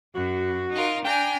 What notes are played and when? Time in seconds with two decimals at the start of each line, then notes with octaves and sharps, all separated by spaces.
0.15 F#2 F#4
0.74 D#4 F4 A#4
1.05 D4 G5 G#5 A#5